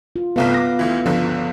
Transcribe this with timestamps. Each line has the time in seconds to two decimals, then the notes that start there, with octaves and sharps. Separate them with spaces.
0.16 F4
0.36 G1 C2 A3 B3 B4 F5
0.54 D6 A#6
0.79 D2 E3
1.06 G1 C#2 D3 F3